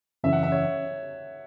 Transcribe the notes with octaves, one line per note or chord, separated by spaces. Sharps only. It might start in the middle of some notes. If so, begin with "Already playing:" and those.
F#2 C#3 E3 C#4 E5
F#5
E5
C#5